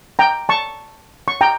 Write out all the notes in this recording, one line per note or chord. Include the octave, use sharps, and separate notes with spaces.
G5 A#5
A5 C#6
C#6
G5 A#5